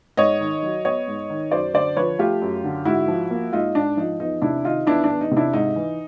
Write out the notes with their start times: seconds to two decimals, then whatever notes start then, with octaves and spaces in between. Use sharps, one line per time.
0.17 G#2 C#5 D#5
0.41 D#3
0.63 F#3
0.85 B3 C#5 D#5
1.07 G#2
1.30 D#3
1.51 F#2 C5 D5
1.74 D3 C5 D5
1.97 F3 B4 C#5
2.19 A3 F4 G4
2.42 F#2
2.64 D3
2.85 G#2 E4 F#4
3.08 F3
3.31 A#3
3.52 G#2 D#4 F4
3.75 G#2 D4
3.97 F3 D#4
4.19 E2 D#4
4.42 C3 D4 E4
4.64 D#3 D#4 F4
4.87 E2 D4 E4
5.04 D4
5.10 E2
5.21 D#4
5.31 C3
5.37 D4 E4
5.53 G#2 D#4
5.76 E3